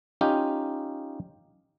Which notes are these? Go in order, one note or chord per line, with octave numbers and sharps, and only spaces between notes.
C#4 D#4 F4 G4